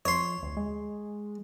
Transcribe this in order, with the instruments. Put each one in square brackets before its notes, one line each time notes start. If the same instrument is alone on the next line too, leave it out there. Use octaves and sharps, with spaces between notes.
[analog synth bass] F2 [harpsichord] C#5 C6
[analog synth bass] D2
G#3